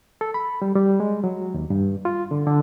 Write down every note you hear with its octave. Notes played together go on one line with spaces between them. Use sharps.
A4
B5
G3
G3
G#3
F#3
D#2
G2
F4
D3
D3